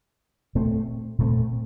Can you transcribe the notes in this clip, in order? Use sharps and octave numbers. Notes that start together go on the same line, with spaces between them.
A#2 A3 C4
A#2 A3 C4